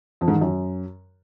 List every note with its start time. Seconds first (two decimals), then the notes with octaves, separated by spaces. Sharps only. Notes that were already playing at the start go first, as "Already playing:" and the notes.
0.21 F2
0.28 G#2
0.35 D#3
0.41 F#2